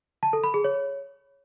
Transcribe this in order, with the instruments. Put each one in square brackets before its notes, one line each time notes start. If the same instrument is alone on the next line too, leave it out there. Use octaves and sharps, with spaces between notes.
[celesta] A5
A4
B5
G#4
C#5